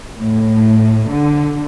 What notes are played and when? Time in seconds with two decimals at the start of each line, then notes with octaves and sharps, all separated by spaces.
0.18 A2
1.08 D3